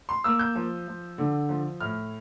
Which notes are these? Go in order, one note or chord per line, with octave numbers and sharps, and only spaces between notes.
C6
A#3 E6
G6
F3
F3
D3
F3
A2 F6